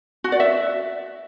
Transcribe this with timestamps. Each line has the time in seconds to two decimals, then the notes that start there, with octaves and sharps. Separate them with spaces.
0.24 F#4
0.32 D5
0.40 E5